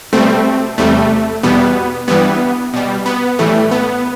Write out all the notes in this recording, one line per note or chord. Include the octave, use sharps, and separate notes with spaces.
B2 G3 A3 C4
E2 C3 G3 A3
E2 B2 G3 B3
G2 E3 G3 B3
B2 G3
B3
A2 E3 G3 A3
B3